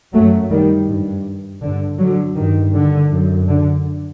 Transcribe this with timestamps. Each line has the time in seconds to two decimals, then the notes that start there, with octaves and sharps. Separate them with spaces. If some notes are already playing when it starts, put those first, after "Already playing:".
0.13 F#2 F#3 A3
0.50 D#3 G3
0.88 G2
1.62 G2 D3
1.98 D3 F#3
2.36 G2 D#3
2.74 D3
3.10 F#2
3.48 D3